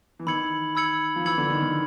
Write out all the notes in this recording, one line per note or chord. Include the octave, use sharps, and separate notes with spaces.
E3
D#3 B5 E6 G#6 C#7 F#7
B5 E6 G#6 C#7 F#7
F3
E3 B5 E6 G#6 C#7 F#7
D3
D#3
D#3